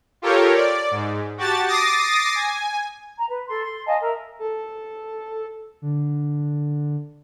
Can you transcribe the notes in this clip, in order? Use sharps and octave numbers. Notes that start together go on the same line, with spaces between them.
F4 G4 A4 A#4 C#5
D5
G#2
F#4 G4 A5 A6
D6 D#6 A6 A#6 C7
G#5
A#5
B4
A4 C6
C6
D#5 F5 G#5 A5
A#4 E5
A4
D3